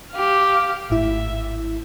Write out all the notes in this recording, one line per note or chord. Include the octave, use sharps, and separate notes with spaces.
G4 F5
G#1 A2 E4 E5